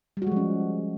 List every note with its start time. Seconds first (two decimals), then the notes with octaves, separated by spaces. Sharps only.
0.17 G3
0.22 F#4
0.27 G#3
0.32 F3
0.36 C#4